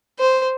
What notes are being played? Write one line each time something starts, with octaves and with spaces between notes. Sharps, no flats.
C5